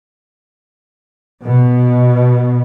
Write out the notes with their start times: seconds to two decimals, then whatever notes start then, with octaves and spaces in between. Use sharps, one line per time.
1.44 B2